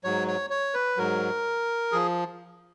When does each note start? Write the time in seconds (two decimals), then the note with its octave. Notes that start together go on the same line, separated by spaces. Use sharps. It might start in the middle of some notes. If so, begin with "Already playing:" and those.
0.04 G#2 F#3 C#5
0.28 C#5
0.50 C#5
0.74 B4
0.97 G#2 F#3 A#4
1.92 F3 G#4